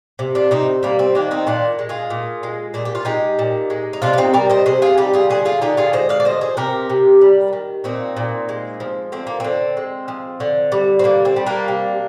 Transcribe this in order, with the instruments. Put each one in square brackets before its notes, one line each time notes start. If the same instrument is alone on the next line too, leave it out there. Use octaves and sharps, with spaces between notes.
[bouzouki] C3
D4 F4
C3 C4 D#4
G3 A#3
C4
D#3 A#3 D4
C4 D#4
A#2 D4 F4
G#3
F4 G#4
A#2
G#3
A#2 G#4
G4
F4
G#3 D#4 G4
A#2
G#3
D#4
C3 D4 F4
F4
C4 D#4
G3 A#4 D5
C5 D#5
C3 G#4 C5
F4 G#4
G3 D#4 G4
F4 G#4
D3 G#4 C5
F4 G#4
D3 D#4 G4
F4 G#4
G#3 C5 D#5
D5 F5
D5
F3 C5 D#5
G#4 C5
C3 G4 A#4
C3
G3
D#3
A#2 C4 D#4
A#2
G#3
F3
D3 C4
A#3
D3 C4
G#3
F3
D3
G3
C4
D3 A#3
C4
G3
A#3 D4
C3